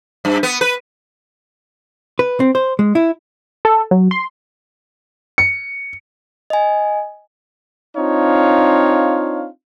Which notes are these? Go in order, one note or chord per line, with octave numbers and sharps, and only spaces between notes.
G2
B3
B4
B4
C4
C5
G#3
E4
A4
F#3
C6
C#7
D#5 G#5
C4 D4 D#4 F4 C#5 F5